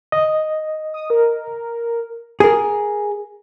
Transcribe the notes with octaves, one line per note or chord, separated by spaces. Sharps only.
D#5
D#6
A#4
G#4 A#4